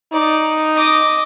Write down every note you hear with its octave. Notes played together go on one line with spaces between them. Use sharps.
D#4 D5
D#5 D6